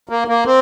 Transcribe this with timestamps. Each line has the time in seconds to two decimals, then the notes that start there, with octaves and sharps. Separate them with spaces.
0.09 A#3
0.28 A#3
0.45 C4